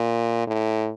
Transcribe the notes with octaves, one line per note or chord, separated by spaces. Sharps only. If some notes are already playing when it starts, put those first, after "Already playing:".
Already playing: A#2
A2